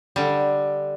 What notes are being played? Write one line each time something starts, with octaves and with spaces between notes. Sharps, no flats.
D3 G3